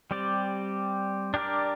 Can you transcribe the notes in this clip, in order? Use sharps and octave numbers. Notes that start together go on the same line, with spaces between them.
G3 C4 G4 D5
D4 G4 A#4 D5